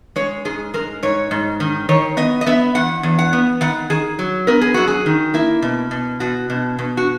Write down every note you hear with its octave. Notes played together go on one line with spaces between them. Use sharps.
G#3 C#5
G#2 G#4
G#3 A#4
G#2 C#5
G#2
D#3
D#3 C#5
B3 D#5
D#5
B3 E5
E2 F#5
E2
F#5
B3
D#3 F#5
D#3 G#4
F#3
B3 A#4
G#4
F#2 F#4
G#4
D#3
A#3 E4
B2
B2
B2 F#4
B2
B2
F#4